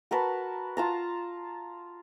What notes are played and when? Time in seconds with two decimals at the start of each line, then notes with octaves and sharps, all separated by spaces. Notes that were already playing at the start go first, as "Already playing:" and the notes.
0.11 F#4 A#4 B4 A5
0.77 F4 A5 A#5